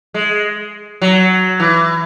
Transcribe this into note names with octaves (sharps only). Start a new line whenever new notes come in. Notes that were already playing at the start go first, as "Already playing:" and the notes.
G#3
F#3
E3